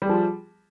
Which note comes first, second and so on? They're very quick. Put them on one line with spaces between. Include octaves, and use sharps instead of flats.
G3 G#4 F3 F4